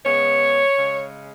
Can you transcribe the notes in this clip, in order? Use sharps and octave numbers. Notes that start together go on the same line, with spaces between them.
C#3 G#3 B3 C#5
C#3 G#3 C#4